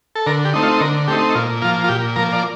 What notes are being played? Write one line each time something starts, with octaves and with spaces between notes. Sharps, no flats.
A4
D3 A#4
G4
A3 C4 D#4
F4
D3 A#4
A3 C4 D#4 G4
A#2 F4
F3 A#3 F4
F4
A#2 G4
F3 A#3 A#4
D5